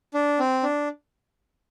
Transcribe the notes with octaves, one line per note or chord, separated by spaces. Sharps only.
D4
C4
D4